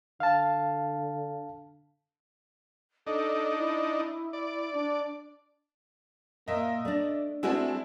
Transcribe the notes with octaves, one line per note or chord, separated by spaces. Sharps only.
D3 F5 A5
D4 D#4 A4
E4
D5
D4
A#2 A#3 D#5 E5
A3 D4 D5
G#3 A3 C4 D4 E4 F#4 G#4